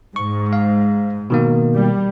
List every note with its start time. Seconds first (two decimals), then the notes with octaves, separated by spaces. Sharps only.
0.16 G#2 C#6
0.53 F5
1.30 B2 D#3 A#3
1.75 G3